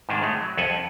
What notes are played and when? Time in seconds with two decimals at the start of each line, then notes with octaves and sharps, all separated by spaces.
0.09 G#2 C3 D#3 G#3 D4
0.21 A2 G#3 A3
0.41 F#3
0.57 C2 F2 C#4 A4 F#5 G#5
0.70 F2